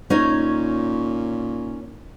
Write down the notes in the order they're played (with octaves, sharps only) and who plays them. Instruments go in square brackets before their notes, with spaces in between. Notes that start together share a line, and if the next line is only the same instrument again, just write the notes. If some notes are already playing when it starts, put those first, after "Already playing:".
[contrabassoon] A#2 [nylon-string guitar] C#4 D#4 C#5